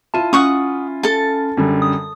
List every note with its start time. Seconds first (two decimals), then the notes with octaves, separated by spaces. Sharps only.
0.14 E4 F4 A5 D#7
0.33 C#4 F#5 C#6 D#6
1.03 A4 A5
1.57 F#2 D3 G3
1.82 D#6